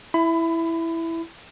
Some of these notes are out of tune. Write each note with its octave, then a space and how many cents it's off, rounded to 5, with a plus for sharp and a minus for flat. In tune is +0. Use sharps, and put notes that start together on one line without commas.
E4 +0 B5 +25